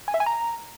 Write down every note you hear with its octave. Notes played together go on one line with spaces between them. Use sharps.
G#5
E5
G#5
A#5